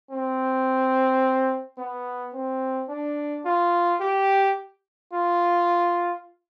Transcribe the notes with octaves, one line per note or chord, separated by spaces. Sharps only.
C4
B3
C4
D4
F4
G4
F4